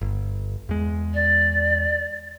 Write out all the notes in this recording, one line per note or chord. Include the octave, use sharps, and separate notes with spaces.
G1
E2 G#3
D5